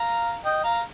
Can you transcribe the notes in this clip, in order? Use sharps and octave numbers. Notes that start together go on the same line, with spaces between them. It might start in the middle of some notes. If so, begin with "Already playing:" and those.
Already playing: F5 A#5
D#5 G5
F5 A#5